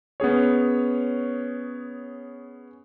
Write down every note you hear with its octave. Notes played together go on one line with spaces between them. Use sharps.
B3 C#4 G#4 C#5